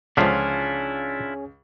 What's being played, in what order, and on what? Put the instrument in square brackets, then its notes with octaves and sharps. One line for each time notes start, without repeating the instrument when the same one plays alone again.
[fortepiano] C#2 [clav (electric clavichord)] D3 F3 [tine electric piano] C#4 G#4 [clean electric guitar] D4 E4 F4